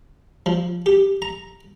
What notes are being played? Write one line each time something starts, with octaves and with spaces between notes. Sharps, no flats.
F3
G4
A#5